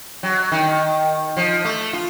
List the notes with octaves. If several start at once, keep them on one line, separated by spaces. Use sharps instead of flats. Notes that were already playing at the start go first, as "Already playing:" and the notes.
F#3
D#3
F3
A3
F4